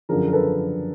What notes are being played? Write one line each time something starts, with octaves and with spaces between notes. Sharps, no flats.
F#2 D3 F3 G#4 A#4
A#4
A4 B4